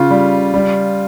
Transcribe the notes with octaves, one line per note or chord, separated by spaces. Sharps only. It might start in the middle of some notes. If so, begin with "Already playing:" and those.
Already playing: C#3 F4
G3
G3